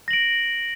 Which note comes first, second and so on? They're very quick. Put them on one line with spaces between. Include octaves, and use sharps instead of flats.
A#6 F#7 D7